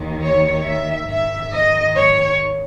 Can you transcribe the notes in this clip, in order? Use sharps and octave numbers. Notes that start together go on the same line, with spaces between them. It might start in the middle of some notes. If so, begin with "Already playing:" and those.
Already playing: D#2 D#3
C#5
E5
G#2 D#3 E5
D#5
C#5